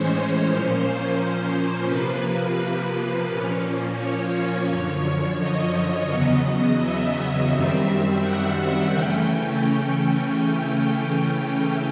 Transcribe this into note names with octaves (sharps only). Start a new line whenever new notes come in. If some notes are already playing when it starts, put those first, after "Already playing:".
Already playing: A2 E3 G#3 C#4 C5 C#5
A#2 F3 A#3 C#4
C3 F3 A#3 B4
A#2 F3 A#3 C#4
C#5
F#2 D3 F3
D#5
E2 C#3 F#3 B3
E5
F#2 D#3 G3 C4
F#5
C#3 E3 A3 C#4 G5